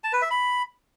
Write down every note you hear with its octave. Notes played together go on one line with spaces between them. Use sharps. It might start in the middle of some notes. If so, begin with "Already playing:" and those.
A5
B4
E5
B5